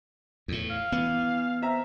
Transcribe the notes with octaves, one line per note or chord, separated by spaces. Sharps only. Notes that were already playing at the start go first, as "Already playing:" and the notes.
E2 A2
F5
E3 B3
C4 E5 A#5